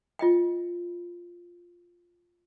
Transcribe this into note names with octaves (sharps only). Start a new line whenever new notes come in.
F4 D#5 G5